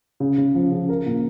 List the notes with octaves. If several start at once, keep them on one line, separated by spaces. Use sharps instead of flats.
C#3
C#3
F3
C#3
A#4
A#2